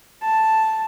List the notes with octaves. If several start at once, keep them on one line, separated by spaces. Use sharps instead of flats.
A5